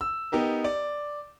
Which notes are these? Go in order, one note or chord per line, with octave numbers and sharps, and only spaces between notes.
E6
B3 D#4 G4 A#4
D5